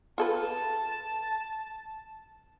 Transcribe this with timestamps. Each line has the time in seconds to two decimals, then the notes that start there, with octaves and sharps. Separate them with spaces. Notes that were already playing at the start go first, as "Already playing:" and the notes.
0.18 F4 A4 B4 A5